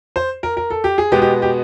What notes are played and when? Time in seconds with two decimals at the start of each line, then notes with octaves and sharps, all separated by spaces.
0.16 C5
0.43 A#4
0.57 A#4
0.70 A4
0.84 G4
0.98 G#4
1.12 B2 G#3 B3 G4
1.22 G4
1.42 G4